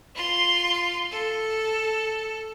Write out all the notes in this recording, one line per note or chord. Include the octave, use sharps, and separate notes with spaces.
F4 C6
A4